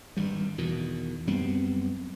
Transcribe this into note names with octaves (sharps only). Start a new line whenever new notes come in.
G#1 G2 G3
E2 B2 D#3
F#2 G3 B3 C4